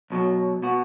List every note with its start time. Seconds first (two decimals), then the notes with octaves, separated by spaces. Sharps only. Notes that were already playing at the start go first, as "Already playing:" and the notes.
0.10 B1 B2 F#3
0.63 B2 B3 F#4